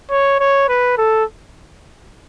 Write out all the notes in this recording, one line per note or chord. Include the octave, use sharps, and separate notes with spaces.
C#5
C#5
B4
A4